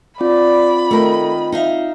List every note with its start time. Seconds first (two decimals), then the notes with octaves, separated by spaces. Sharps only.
0.21 C4 F4 D5 B5
0.91 D#3 A3 A#4
1.52 D#4 E5 F5